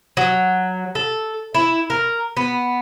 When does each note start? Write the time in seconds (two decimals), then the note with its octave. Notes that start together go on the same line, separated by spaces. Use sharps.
0.17 F#3
0.95 A4
1.55 E4
1.90 A#4
2.37 B3